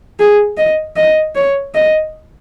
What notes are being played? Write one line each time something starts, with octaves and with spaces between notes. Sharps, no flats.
G#4
D#5
D#5
C#5
D#5